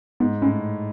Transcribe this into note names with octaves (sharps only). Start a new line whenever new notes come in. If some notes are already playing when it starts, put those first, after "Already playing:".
G#2 B3
A2 C#4